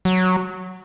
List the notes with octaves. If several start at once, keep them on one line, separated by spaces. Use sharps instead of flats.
F#3